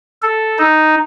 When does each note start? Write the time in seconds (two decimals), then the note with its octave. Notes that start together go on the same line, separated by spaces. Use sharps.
0.22 A4
0.58 D#4